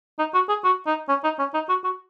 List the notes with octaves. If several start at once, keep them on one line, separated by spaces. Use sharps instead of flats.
D#4
F#4
G#4
F#4
D#4
C#4
D#4
C#4
D#4
F#4
F#4